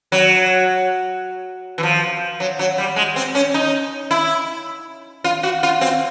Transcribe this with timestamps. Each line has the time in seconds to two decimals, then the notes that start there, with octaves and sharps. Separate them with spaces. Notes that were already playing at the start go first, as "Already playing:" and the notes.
0.12 F#3
1.78 E3
1.83 F3
2.40 F#3
2.59 F#3
2.78 G3
2.96 G#3
3.16 C4
3.35 C#4
3.54 D#4
4.11 E4
5.24 F4
5.43 F#4
5.63 F4
5.81 C4